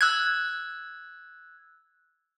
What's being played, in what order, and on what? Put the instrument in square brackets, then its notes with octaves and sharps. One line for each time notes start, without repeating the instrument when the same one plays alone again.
[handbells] E6 F#6 G#6